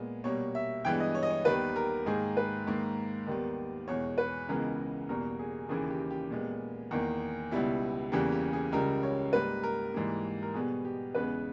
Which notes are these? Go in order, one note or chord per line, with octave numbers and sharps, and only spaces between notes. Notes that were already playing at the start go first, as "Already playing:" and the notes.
Already playing: A#2 G#3 B3
B2 G3 A#3 C#5
E5
G2 E3 G#3 B3 G5
D#5
C#5
D#5
C#5
D#2 D#3 G3 B3 B4
A#4
G#2 D#3 A#3 G#4
B4
G#2 D#3 A#3
D#2 D#3 G3 B3
E2 B2 G#3 C#5
B4
C#2 C#3 E3 G#3 B3 A#4
E2 B2 G3 A#3 A#4
G#4
D#2 C#3 E3 G#4
G4
G4
A#2 G#3 B3
E2 D#3 A#3
C#2 B2 G3 B3 E4
E2 C#3 E3 G3 A#3 G4
G4
G#4
C#2 C#3 G3 A#4
C#5
G#2 G3 A#3 B4
A#4
G#2 E3 G3 A#3
A#4
B2 G3 B3 G#4
G4
E2 C#3 G#3 B3 B4